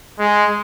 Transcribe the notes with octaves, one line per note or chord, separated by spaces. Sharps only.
G#3